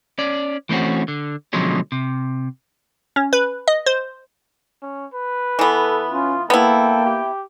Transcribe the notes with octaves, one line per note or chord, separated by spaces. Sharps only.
C#4 D5
E3 A3 C4 C#4 F#4
D3
B2 D3 F3 F#3 G#3 C#4
C3
C#4
B4
D#5
C5
C#4
B4
E3 B3 A4
C#4 F4
A#3 B3 E4 A4 G5
G4